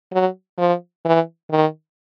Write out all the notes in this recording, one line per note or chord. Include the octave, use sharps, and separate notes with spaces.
F#3
F3
E3
D#3